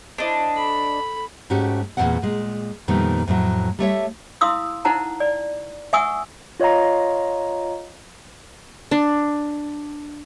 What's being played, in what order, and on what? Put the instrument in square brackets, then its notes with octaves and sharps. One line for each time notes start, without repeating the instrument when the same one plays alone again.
[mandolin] D4 D#5 [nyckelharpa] E4 C5
[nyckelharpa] A4 B5
[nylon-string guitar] G#2 A3 C#4 F#4 G4
E2 A#2 A3 A#3 C4 F#5
A#2 G#3
F2 A#2 D#3 G3 A3 B3
F2 A2 F#3
G3 A3 C#5 E5
[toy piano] E4 F5 C6 D#6 E6
D#4 E4 C5 F#5 A5 A#5
D5
E5 F#5 G#5 C#6 D#6 E6
[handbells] F4 C#5 D#5 F5 A#5
[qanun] D4